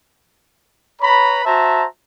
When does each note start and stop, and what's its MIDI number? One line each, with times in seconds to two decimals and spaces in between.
1.02 1.44 71
1.02 1.44 73
1.02 1.44 82
1.02 1.44 83
1.45 1.86 66
1.45 1.86 72
1.45 1.86 76
1.45 1.86 81
1.45 1.86 82